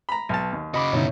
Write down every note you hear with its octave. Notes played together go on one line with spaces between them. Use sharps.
A#5 B5
B1 A5
D#2
C#3 F#4 D#5 B5 D6
G2 B2 D3 D#4 E4 C#5